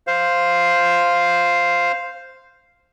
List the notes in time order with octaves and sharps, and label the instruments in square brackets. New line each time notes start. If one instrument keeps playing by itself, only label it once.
[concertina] C5 F5